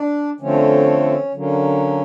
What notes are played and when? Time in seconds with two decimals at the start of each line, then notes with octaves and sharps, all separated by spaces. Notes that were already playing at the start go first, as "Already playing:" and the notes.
Already playing: D4
0.40 D3 F3 A3 C4 C#4
1.33 D3 F#3 A#3 C#4